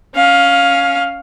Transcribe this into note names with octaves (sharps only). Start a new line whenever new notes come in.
C#4 F5